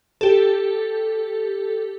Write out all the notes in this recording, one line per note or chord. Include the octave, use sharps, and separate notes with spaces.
G4 A4